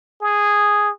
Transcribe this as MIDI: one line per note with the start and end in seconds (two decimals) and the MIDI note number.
0.21 0.91 68